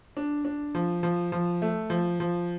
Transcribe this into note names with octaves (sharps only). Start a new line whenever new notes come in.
D4
D4
F3
F3
F3
A3
F3
F3